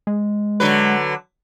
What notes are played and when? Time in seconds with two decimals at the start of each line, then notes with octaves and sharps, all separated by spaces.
0.07 G#3
0.60 D3 F#3 B4